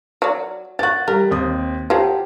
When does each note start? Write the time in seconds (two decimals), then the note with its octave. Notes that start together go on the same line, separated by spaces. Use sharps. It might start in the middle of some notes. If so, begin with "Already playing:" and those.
0.22 F#3 D5
0.79 F#4 G4 F#6 A6
1.08 G3 A#4
1.31 D#2 C4 D#6
1.90 F3 F#3 G4